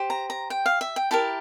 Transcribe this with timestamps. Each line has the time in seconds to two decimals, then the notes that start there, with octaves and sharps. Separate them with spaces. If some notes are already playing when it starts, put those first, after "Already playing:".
Already playing: G4 C5
0.10 A#5
0.30 A#5
0.50 G5
0.66 F5
0.81 E5
0.96 G5
1.11 E4 G4 A#4 A5